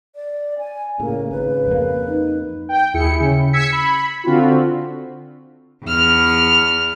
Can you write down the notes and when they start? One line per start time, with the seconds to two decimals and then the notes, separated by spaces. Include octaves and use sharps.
0.16 D5
0.59 G#5
1.00 A2 C#3 A#3
1.31 G#1 B4
1.67 F2 A#3
2.08 D#4
2.69 G5
2.94 D#2 E4 G#4 C#7
3.20 C#3
3.53 E6 G#6 B6 C#7
3.72 B5
4.24 D3 C4 F4 F#4
5.85 E2 F6